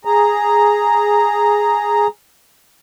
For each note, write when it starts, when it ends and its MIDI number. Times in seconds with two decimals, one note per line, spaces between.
0.05 2.07 68
0.05 2.07 82